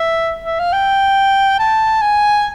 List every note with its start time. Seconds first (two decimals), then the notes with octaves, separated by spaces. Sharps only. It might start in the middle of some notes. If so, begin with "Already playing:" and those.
Already playing: E5
0.45 E5
0.59 F5
0.73 G5
1.59 A5
2.02 G#5